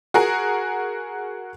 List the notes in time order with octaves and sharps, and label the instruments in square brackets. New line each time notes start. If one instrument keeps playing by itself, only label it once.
[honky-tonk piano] F#4 G#4 A#4